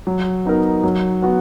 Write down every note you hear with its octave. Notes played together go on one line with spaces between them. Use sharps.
F#3
B3 D#4 A#4
F#3
B3 F#4